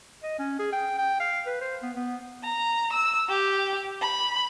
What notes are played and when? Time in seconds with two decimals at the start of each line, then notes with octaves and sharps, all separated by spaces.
0.23 D#5
0.39 C#4
0.59 G#4
0.73 G5
0.98 G5
1.20 F5
1.46 B4
1.61 C5
1.82 B3
1.96 B3
2.43 A#5
2.93 E6
3.29 G4
4.01 B5